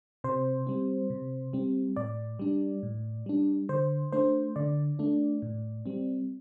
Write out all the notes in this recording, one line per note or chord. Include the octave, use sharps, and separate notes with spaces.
C3 C5
G3 C4
C3
G3 C4
A2 D5
G3 D4
A2
G3 D4
D3 C5
A3 D4 C5
D3 D5
A3 D4
A2
G3 C4